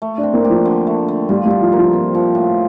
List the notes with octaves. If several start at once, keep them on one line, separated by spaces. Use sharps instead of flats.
A3
D4
C4
A#3
F3 G4
D3
A3
D3
G3 F4
G3
F4
F3
F3 A#3
C4
F3
A2